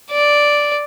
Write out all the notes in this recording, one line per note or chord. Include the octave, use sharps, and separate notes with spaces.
D5